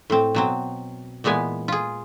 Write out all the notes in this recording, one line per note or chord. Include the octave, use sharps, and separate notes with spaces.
A2 C4
B2 F#3 C4
A#2 E3 G#3 B3 G#5
F4 G#4